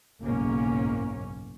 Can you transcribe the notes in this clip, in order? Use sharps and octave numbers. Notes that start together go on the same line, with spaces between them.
F#1 B1 G#2 A#3 C#4